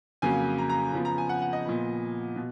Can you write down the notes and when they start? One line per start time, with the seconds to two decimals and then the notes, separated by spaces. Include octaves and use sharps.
0.22 F2 C#3 F#3 A#3 G#5
0.58 A#5
0.70 A#5
0.93 C#3 F3 B3
1.05 A#5
1.18 G#5
1.29 F#5
1.42 F#5
1.53 D#5
1.65 A#2 F3 B3
2.36 B2